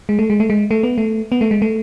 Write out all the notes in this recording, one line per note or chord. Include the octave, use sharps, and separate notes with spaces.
G#3
A3
G#3
A3
G#3
A3
B3
A3
B3
A3
G#3
A3